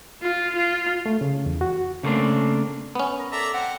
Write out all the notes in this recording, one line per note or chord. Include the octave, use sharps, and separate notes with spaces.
F4
F4
A3
C#3
E2
F#4
C#3 G3 A3 A#3 C4 D4
B3 C#4
A#4
A4 D5 E5 A#5
C4 F#5